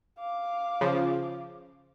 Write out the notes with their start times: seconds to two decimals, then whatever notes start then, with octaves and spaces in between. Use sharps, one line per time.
0.18 F5 D6
0.81 C#3 F3